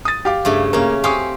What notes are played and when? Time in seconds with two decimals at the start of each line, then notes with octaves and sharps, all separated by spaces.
0.05 D#6 A6
0.25 G4 F5 D6
0.45 G2 C#3 A3
0.73 C#3 A#3 C#4
1.04 C4 G4 F5 G#5 C#6 D#6